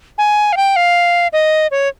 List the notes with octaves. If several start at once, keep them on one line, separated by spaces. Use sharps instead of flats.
G#5
F5
G5
F5
D#5
C#5